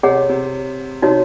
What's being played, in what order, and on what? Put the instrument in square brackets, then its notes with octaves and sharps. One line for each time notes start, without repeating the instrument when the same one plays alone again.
[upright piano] C3 [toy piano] G#4 C#5 F#5
[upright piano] C3
[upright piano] C3 [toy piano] D#4 F#4 C#5